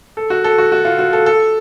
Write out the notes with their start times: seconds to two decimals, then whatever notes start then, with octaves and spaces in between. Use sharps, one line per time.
0.17 A4
0.30 F#4
0.44 A4
0.58 F#4
0.72 F#4
0.85 F4
0.99 F#4
1.13 A4
1.26 A4